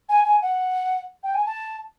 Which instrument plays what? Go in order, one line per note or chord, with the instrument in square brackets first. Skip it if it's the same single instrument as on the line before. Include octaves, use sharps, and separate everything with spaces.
[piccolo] G#5
G#5
F#5
G5
G#5
A5